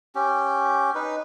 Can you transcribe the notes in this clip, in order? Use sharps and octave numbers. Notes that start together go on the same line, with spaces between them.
C#4 G4
D#4 B4